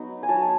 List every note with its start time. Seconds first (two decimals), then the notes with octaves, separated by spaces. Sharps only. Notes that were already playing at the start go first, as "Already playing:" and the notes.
Already playing: F#3 B3 D#4
0.23 G#5
0.29 F#3 A5